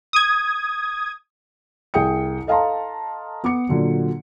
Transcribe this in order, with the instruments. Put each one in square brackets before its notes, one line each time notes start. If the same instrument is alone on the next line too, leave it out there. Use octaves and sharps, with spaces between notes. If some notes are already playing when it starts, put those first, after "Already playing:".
[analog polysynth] D#6 G#6
[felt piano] C2 G#4 G5 D#6 C#7
A4 D#5 F5 A5 A#5 C6
B3 D6 C#7
A#2 D3 F#3